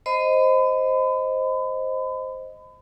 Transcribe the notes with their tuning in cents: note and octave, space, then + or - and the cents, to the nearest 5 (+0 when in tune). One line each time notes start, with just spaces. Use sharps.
C5 +0 D#5 +0 B5 +35